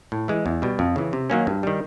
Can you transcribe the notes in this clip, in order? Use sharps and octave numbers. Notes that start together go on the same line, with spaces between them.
A2
E3 G#3
E2
B2 G3
F2
C#3 E3
C3
D#3 F#3 A#3 C#4
G2
D#3 G3